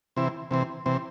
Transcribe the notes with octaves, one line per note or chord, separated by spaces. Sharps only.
C3 E3 C4 E4
C3 E3 C4
C3 E3 C4